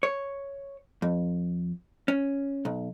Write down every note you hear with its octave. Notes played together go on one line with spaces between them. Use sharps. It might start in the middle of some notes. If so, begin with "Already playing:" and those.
C#5
F2
C#4
B1